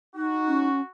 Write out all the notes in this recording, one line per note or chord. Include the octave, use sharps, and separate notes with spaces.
D#4 F#4
C#4